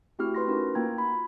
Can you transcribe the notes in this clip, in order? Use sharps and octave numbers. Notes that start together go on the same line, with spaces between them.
A3 C4 E4 F#4 G4 F6
B4 C6 A#6
C#4 D#4 F#4 A#4 B4
A#3 F4 G5 A#5 G#6
B5